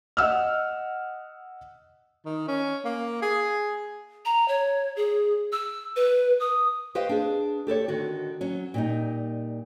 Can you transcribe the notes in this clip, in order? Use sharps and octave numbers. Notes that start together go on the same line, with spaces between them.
D#5 F#5 E6 F6
D#3
C#4
A#3
G#4
A#5
C#5
G#4
E6
B4
D#6
G4 B4 C5 D#5 F5
D4 G#4
G4 A4 B4 C#5
D3 D#3 F#4
F#3 C#4
A#2 G3 D#4